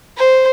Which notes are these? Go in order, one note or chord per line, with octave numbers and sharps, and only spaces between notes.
C5